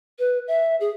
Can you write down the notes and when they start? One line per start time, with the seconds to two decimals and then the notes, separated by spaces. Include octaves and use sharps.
0.19 B4
0.48 E5
0.80 G#4